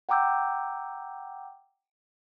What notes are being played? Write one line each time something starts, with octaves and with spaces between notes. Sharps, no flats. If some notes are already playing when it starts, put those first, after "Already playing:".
F#5 G5 A#5 D6 E6 G6